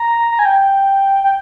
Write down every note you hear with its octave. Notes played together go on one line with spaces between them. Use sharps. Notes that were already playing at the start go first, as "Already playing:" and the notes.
Already playing: A#5
A#5
G#5
G5
G5